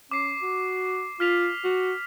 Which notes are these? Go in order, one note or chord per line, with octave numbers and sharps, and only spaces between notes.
C#4 D6 C7
F#4
F4 F6 B6 F7
F#4